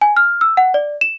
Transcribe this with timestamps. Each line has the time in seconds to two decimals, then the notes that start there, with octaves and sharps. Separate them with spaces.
0.01 G#5
0.16 F6
0.41 E6
0.57 F#5
0.74 D5
1.01 E7